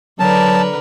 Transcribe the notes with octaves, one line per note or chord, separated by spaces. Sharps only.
D3 F#3 A#4 B4 A5